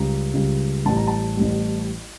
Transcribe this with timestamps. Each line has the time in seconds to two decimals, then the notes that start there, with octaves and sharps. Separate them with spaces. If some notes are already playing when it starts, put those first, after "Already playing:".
Already playing: C#2 C#3 G3 A#5
0.34 C#2 C#3 G3
0.85 A1 A2 G3 A5
0.97 A#5
1.07 A5
1.37 A1 A2 G3